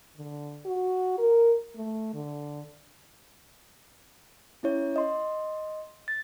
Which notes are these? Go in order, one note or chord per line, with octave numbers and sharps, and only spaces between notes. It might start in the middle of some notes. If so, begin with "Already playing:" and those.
D3
F#4
A#4
A3
D3
C#4 E4 C#5
D#5 C6
A6